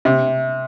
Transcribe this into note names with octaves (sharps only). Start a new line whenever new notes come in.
C3